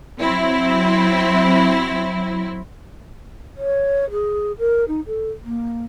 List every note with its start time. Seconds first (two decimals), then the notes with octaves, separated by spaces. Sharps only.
0.19 F#3 C4 E4
3.57 C#5
4.11 G#4
4.59 A#4
4.88 D#4
5.07 A4
5.44 A#3